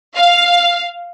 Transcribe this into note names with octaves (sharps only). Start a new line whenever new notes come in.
F5